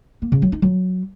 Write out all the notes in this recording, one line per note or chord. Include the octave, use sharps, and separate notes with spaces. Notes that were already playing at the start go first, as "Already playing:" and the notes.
A#3
C#3
F#3
D#4
F#3